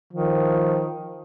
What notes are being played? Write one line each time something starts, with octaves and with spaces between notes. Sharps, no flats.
D#3 F3